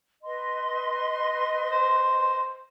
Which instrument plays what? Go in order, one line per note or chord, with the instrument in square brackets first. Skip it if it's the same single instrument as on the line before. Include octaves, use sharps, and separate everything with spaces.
[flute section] B4 D#5 C6
[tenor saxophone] C5